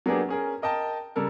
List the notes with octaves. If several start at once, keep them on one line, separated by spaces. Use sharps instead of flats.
F#3 A#3 B3 D4 G4 G#4
C#4 G#4 A#4
A#4 D#5 G5 A5
C#3 G3 A4 A#4